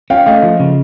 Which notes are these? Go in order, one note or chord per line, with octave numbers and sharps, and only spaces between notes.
C#4 F5 G5
A3 D#5 F5
F3
C#3